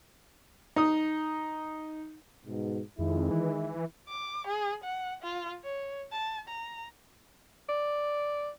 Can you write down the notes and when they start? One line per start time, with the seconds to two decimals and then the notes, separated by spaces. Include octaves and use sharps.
0.76 D#4 D#6
2.45 G#2 B2
2.99 F2 D#3 G#3 E4
3.31 E3
4.08 D6
4.47 G#4
4.84 F#5
5.22 F4
5.64 C#5
6.12 A5
6.49 A#5
7.69 D5